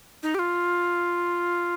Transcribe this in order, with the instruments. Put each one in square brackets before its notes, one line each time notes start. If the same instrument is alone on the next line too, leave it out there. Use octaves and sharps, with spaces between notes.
[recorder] D#4
G4
F4